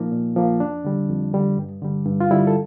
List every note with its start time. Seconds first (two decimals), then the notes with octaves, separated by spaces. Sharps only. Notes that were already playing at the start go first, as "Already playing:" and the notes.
Already playing: A#2 F3 A#3 D#4
0.12 A#2
0.36 F3 A#3
0.60 F2 D4
0.84 D3 G3
1.09 F2
1.33 D3 G3
1.58 G2
1.82 D3 G3
2.06 G2
2.20 F4
2.31 D3 G3 E4
2.47 A4